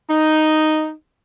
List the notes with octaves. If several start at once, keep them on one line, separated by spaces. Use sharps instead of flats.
D#4